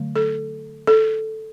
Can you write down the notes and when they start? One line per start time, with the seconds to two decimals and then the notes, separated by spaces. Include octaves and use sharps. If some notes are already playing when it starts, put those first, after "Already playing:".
Already playing: D3 F#3 A3
0.16 A4
0.87 A4